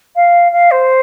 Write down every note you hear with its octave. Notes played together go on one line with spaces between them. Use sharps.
F5
F5
C5